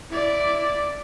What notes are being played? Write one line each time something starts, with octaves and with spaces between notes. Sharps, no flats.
E4 D5